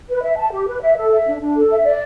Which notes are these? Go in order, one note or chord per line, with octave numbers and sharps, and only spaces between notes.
B4
E5
A5
G4
B4
E5
A4
E5
D4
D4
A4
E5
D5